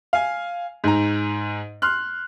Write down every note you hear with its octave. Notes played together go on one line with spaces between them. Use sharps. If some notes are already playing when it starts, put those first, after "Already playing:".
F5 G#5
G#2 A#5
C6 F6 F#6